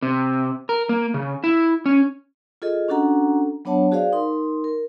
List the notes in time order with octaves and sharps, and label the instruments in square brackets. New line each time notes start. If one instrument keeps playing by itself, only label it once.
[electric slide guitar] C3
A#4
A#3
C#3
E4
C#4
[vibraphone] F4 G#4 A4 D#5
C#4 D4 F#4 A4 F#5 A#5
F#3 B3 D4 C#5 F#5 A5
F#4 G#4 C5 D5 F5
D#4 A#4 C6
A#4